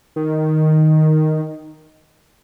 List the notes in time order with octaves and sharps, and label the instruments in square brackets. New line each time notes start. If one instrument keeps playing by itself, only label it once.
[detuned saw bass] D#3